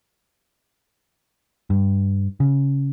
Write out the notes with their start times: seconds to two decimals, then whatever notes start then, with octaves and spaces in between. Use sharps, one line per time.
1.70 G2
2.40 C#3